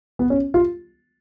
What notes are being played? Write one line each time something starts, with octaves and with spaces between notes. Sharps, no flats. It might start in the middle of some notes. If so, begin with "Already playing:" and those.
B3
C#4
F4